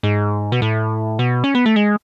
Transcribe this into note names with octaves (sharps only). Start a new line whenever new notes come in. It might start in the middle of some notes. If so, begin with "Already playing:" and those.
G#2
B2
A2
B2
C#4
B3
A3
G#3